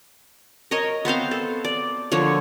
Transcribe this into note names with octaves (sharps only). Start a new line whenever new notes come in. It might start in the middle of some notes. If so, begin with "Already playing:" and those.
A#4 C#5 D#5
B3 C4 C5 F5
A4
D5
D3 F3 A#3 C#5